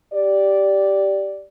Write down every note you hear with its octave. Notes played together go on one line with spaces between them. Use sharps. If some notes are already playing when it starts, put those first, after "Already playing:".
G4 D5